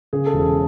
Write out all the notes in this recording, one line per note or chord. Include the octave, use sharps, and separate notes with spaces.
C#3 G#4
A4
E1
G#4